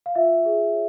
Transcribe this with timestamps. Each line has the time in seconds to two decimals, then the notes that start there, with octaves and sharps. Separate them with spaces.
0.06 F5
0.15 F4 E5
0.45 G#4
0.73 C#5